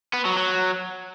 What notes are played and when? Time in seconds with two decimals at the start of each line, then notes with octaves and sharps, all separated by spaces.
0.13 B3
0.25 F#3
0.37 F#3